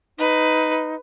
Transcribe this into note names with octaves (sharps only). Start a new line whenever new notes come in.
D#4 B4